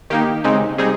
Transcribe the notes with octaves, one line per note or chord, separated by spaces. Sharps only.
D#3 A#3 D#4 G4
C#3 G#3 C4 D#4
C3 G3 C4 D#4 G#4